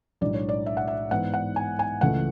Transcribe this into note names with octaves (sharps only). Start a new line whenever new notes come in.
B1 A2 G#3 D4 D5
C#5
D5
E5
F#5
E5
G#2 E3 B3 E4 F#5
F#5
G#5
G#5
C#2 C#3 E3 A3 F#5